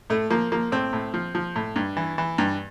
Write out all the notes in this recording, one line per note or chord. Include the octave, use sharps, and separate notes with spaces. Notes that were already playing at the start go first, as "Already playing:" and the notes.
A2 A3
F3 A#3
F3 A#3
A2 C4
A2
F3
F3
A2
G2
E3
E3
G2